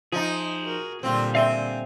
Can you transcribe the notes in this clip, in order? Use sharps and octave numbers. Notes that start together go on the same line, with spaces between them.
F3 D#4 F4 G#4 D#5
F#4 A#4
A#2 D3 G3 C4 F4
C4 D5 E5 F5 G#5 C6